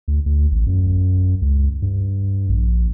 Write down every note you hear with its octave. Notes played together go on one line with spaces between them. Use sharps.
D2
D2
A1
F#2
C#2
G2
A#1